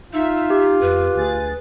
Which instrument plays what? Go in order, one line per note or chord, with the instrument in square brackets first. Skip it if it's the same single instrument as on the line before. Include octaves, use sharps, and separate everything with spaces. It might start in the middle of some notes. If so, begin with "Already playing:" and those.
[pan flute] D#4 [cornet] F4 [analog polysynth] E5
[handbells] G4
[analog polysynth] F2 [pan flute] B4
[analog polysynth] D2 G#4 A6